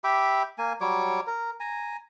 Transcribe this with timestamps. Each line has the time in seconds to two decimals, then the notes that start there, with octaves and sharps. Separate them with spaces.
0.04 G4 E5 B5 D6
0.58 A#3 G#5
0.81 F#3 G3 C#5 D6
1.27 A#4
1.60 G#5 A#5